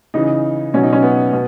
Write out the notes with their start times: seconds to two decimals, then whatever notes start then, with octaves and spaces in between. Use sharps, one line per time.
0.14 C#3 E3 D#4
0.74 B2 F#3 C#4
0.83 D#4
0.93 C#4
1.02 B3
1.33 B2